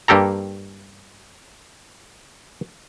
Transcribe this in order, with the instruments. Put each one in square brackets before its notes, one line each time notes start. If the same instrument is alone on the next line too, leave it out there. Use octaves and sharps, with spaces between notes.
[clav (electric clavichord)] G2 A#3 G4 A4 A#5